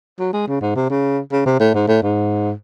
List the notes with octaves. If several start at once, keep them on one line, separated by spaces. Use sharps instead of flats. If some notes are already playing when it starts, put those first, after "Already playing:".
F#3
G#3
C#3
G#2
C3
C#3
C#3
C3
A2
G#2
A2
G#2